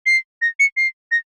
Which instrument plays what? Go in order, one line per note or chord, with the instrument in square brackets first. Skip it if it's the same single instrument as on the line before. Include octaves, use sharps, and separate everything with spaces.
[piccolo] C7
A#6
C#7
C7
A#6